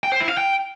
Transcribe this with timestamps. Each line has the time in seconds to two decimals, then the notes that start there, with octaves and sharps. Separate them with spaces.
0.03 G5
0.12 C5
0.20 E4
0.29 F5
0.37 G5